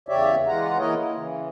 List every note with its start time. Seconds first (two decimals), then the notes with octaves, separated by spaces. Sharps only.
0.09 E2 C#3 G4 C#5 D5 E5
0.47 E3 G#3 F4 F#5 A#5
0.79 E3 A#3 E4 A#4 C#5 D#5
0.96 E4
1.15 C#3 E3